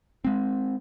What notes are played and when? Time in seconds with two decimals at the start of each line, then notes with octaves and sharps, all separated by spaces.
0.25 G#3 C4